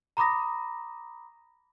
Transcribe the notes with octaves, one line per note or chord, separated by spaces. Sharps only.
A#5 B5 D6 D#6 A#6